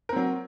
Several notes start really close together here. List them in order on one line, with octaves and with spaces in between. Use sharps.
A#4 C4 F#3